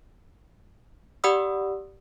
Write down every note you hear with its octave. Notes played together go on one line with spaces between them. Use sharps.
G4 D5 F#5 B5 D#6 E6